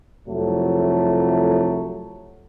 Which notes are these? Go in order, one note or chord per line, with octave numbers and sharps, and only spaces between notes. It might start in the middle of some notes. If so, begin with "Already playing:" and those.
C2 F2 C3 F#3 A3